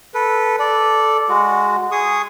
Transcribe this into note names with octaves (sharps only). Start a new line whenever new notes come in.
A4 B4
A4 D5
G#3 F#4
G#4 C#6 D#6